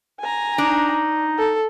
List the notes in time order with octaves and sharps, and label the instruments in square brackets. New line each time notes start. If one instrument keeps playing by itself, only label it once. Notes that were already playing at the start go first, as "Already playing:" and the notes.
[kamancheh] G#5 A#5
[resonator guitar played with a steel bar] D4 [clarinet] D#4
[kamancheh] A4